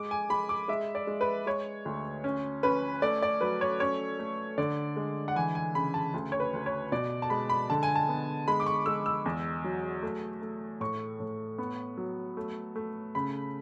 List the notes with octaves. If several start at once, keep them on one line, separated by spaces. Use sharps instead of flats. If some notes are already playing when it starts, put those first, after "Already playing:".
Already playing: G#3 D6
G#5
G#3 B5
D6
G#3 E5
D5
G#3
B4
G#3 C#5
D2
C#4
C#4 B4
A3 D5
D5
F#3 B4
C#5
C#4 C#5
A3
D3 D5
G#3
F#5
E3 G#5
G#5
C#3 B5
A5
D2
C#5
B4
D2
C#5
B2 D5
A5
G#3 B5
B5
D3 A5
G#5
A5
B3
G#3 B5
D6
C#6
G#3 E6
E6
E2
F#3
A3
A3
A2 C#6
A2
B3
F#3
A3
A3
C#3 B5